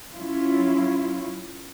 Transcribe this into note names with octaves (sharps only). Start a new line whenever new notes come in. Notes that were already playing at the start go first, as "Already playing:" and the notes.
F#3 C#4 E4 F4